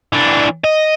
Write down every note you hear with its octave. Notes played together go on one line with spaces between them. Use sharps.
E3 D4
D#5